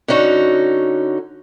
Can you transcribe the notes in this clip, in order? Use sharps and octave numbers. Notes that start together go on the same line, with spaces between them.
D3 C#4 D#4 F#4